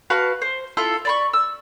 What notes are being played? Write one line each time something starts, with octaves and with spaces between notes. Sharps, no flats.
F#4 B4 F5 A5
C5
E4 F4 A4
D5 B5 C#6
E6